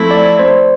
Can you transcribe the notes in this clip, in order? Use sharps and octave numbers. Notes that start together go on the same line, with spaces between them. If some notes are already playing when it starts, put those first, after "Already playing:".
Already playing: F3 A3 C4 E4 A4
D5
C5